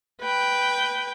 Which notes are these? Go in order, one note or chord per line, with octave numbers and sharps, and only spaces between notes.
B4 G5